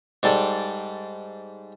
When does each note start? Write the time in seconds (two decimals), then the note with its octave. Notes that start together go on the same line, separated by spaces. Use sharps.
0.23 G#2 G3 A4 D5